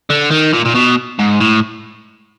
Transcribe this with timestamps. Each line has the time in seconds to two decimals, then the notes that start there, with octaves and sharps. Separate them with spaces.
0.10 D3
0.31 D#3
0.53 A#2
0.66 A#2
0.75 B2
1.19 G#2
1.40 A2